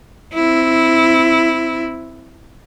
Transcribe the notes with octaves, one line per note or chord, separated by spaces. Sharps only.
C4 E4